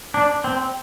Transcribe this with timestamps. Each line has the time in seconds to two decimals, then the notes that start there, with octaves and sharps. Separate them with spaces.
0.14 D4
0.44 C4